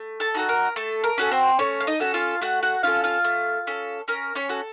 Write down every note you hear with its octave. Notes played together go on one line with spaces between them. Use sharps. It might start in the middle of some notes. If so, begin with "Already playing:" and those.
Already playing: A3
A4 A5
D#4 F#4 A4
A#4
A3 A4
A#4
C#4 F#4 A4
C4 C5
A3 C#4 C#5
F5
D#4 D#5
C#4 F#4 A4
F4 F5
A3 F#4 F#5
F#4 F#5
C#4 F4 A4 F5
F4 F5
A3
C#4 A4
C#4 A#4
C#4 C#5
F#4 A4